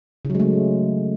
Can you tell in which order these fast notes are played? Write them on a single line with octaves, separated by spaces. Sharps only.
C#3 F#3 G#3 A3